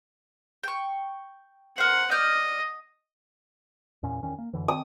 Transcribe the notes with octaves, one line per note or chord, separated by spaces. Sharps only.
G5 C#6
A#4 C5 F#5
D5 D#5 F6 G6
E2 A#2 C#4
E2 D#3 C#4
A#3
F#2 D3 E3
D#3 C4 D#6